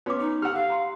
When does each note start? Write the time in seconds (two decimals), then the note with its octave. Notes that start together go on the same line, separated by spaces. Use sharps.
0.06 B3 C#4 F#4 D6
0.19 D#4
0.42 G4 F#5 E6 F6
0.54 F5
0.70 A#5 C6